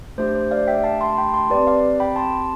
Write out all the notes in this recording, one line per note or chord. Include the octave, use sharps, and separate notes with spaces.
A3 D4 G4 C5
C5
D5 F5
E5 G5
F5 A5
A5 C6
G5 B5
A5 C6
C4 G4 B4 D5
D5 F5
G5 B5
A5 C6